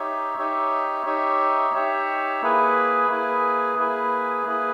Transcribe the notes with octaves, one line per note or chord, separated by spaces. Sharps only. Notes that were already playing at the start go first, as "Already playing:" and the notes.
Already playing: D#4 G4 C#5 E5
D#4 G4 C#5 E5
D#4 G4 C#5 E5
D#4 G4 C#5 E5
A#3 E4 G#4 B4
A#3 E4 G#4 B4
A#3 E4 G#4 B4
A#3 E4 G#4 B4